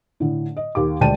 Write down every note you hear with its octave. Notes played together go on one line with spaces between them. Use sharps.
A2 D3
D#5
D#2 G4 D6
D2 G#3 D5 G5 A5 D#7